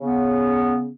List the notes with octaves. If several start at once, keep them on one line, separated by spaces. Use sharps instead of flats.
C#3 B3